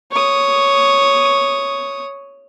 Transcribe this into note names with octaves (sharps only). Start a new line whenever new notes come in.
C#5 D#6